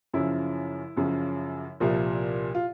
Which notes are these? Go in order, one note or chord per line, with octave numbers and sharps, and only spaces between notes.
F#2 C#3 F3 E4
F#2 C#3 F3
C2 A#2 F3
F4